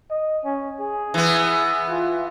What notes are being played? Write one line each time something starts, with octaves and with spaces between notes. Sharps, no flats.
D#5
C#4
G#4
E3 B3
F4